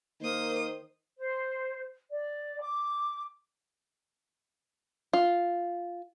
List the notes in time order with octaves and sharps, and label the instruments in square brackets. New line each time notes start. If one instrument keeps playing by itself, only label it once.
[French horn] D#3 [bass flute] A#3 [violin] C5 D#6
[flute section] C5
D5
D6
[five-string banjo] F4